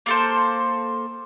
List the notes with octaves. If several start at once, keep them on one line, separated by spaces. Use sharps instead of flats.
A#3 A4 C5